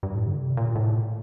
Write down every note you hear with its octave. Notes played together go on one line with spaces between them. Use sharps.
G2
A2
D3
C3
A#2
A2